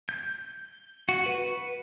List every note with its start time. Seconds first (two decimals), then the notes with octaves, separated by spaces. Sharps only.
0.09 G6
1.09 F#4
1.26 B4